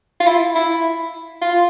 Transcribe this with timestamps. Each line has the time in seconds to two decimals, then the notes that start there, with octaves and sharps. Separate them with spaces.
0.20 F4
0.26 E4
0.55 E4
1.42 F4